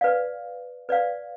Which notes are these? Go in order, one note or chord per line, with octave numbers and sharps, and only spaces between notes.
B4 D5 F5
B4 D5 F5